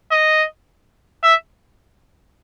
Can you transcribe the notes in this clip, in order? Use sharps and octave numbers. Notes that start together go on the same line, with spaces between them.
D#5
E5